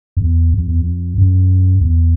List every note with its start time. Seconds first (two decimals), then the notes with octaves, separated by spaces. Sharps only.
0.17 F2
0.22 E2
0.54 F2
0.67 E2
0.80 F2
1.18 F#2
1.81 E2